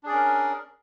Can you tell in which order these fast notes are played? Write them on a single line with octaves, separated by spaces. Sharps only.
D4 G#4 D5 C#4 A#4